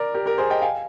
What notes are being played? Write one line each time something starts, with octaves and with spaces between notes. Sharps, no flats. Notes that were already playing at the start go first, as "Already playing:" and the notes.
Already playing: A#4 D5
G4 A#4
G4 A#4
G#4 C5
D#5 G5
F5 G#5